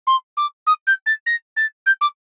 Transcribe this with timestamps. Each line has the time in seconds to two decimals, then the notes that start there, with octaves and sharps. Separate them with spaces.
0.07 C6
0.37 D6
0.67 D#6
0.87 G6
1.06 A6
1.26 A#6
1.57 A6
1.86 G6
2.01 D6